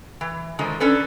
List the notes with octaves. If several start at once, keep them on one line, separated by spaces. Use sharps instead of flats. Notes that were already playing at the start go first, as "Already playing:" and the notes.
E3
D3 D#3 F3 G#3
C#4 D4 A4 B4